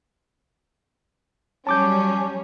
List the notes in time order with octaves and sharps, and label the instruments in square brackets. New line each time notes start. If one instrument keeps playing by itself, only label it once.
[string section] F#3 G3 C#4 [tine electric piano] A5 D6 G6